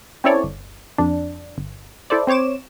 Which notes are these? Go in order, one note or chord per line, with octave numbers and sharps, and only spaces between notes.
C4 C#4 E4 A4 C#5 D5
G1
F2 D4
G1
E4 A4 C5 D5
C4 C5 C#5 D6 E7